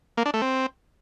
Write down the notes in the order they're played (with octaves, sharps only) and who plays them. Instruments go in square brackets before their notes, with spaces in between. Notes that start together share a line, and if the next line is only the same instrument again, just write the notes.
[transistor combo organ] A#3
D4
A3
C4